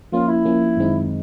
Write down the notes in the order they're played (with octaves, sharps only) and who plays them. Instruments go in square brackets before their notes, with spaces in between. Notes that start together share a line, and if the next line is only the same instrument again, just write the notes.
[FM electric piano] F3 A#3 C#4 [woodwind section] F4
[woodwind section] E4
[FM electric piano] F3 A#3 C#4
F#2 D#3 G#3 C4 D#4